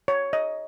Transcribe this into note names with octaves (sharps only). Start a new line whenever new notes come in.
C#5
D#5